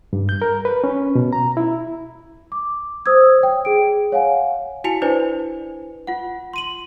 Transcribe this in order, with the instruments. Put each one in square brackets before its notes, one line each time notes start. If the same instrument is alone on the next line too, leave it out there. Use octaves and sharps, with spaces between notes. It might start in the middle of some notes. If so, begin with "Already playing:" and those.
[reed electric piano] G2
G6
A#4
B4
C#4
B2
A#5
E4
[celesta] D6
C5 D#6 E6 G#6
C#5 G5
G#4 D7
C#5 F5 F#5 G#5
E4 F#4 G#5 A5 C#7 F7
D4 E4 B4 C5 D5 G#5
F4 F#5
C6 D#7 F#7